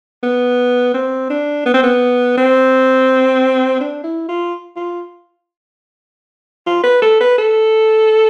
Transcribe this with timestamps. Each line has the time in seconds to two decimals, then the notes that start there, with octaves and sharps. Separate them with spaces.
0.23 B3
0.94 C4
1.30 D4
1.66 B3
1.74 C4
1.83 B3
2.37 C4
3.81 D4
4.04 E4
4.29 F4
4.76 F4
6.67 F4
6.84 B4
7.02 A4
7.20 B4
7.38 A4